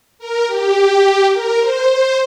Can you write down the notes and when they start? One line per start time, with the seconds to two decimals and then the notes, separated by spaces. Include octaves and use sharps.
0.19 A#4
0.47 G4
1.32 A#4
1.60 C5
1.89 C5